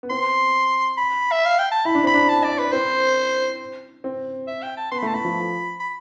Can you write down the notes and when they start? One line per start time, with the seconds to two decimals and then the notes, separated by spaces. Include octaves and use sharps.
0.03 B3
0.10 C4 C6
0.97 B5
1.32 E5
1.46 F5
1.59 G5
1.72 A5
1.85 E4 B5
1.95 D4
2.04 C4 B5
2.14 D4
2.29 A5
2.44 D5
2.58 B4
2.72 C4 C5
4.04 C4
4.48 E5
4.63 G5
4.77 A5
4.91 B3 C6
4.99 B5
5.03 A3
5.07 A5
5.14 A3 B5
5.25 F3
5.80 B5